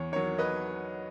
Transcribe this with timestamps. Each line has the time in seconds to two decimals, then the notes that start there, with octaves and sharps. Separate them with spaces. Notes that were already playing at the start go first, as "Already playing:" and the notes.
Already playing: E2 C#5
0.12 D#3 F#3 C#5
0.38 B4 D#5